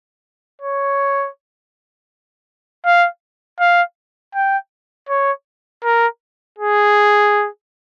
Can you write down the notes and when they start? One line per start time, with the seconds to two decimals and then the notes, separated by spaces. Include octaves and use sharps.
0.62 C#5
2.86 F5
3.60 F5
4.35 G5
5.09 C#5
5.84 A#4
6.59 G#4